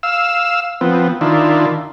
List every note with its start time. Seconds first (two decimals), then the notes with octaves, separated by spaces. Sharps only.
0.03 F5 E6
0.81 F3 B3 C4
1.21 D#3 D4 E4 F4